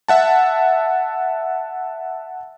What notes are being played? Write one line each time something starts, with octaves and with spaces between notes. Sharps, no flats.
E5 F#5 A5